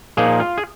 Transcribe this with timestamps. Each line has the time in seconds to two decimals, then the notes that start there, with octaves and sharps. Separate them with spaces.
0.17 A#2 F3 A#3 D#4 G#4
0.40 F4
0.58 G#4